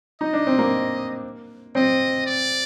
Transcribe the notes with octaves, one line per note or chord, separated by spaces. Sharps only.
D#4 D#5
D4
C4
A#3
C4 D#5
D5